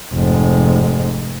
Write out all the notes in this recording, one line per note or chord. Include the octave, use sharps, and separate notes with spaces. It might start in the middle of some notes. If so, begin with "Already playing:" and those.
F1 G#2